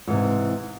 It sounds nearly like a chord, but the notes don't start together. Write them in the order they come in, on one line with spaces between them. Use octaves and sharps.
G#2 E3 C3